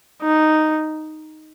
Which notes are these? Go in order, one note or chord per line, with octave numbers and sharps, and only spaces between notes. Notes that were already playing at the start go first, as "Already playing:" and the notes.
D#4